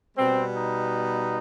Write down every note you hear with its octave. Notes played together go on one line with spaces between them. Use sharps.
B2 G3 B3 C4
D#4